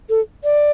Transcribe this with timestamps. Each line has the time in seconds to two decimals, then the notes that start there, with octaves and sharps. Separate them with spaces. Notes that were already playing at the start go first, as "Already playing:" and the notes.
0.10 A4
0.44 D5